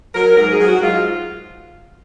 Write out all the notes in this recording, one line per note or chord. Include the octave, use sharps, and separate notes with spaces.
F#3 A#4
G#2 A#4
G#4
F#3
F#4
G#2 F4